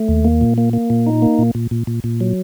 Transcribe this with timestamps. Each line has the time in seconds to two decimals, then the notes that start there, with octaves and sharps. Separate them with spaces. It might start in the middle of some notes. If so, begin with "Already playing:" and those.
Already playing: A3
0.08 D#2
0.25 A#3
0.41 A#2
0.58 A#3
0.73 A#3
0.90 A#2
1.06 D#4
1.22 A#3
1.39 A#2
1.55 A#2
1.71 A#2
1.87 A#2
2.04 A#2
2.20 F#3